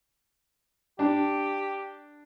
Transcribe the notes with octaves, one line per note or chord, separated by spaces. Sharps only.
D4 G4